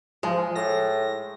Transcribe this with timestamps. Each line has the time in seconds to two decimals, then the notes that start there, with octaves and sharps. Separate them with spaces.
0.23 F3 G#3
0.55 A2 A#6